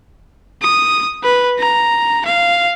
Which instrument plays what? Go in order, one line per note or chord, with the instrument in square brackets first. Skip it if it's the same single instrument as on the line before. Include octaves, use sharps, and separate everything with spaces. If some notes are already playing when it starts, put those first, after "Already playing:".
[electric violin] D#6
B4
A#5
F5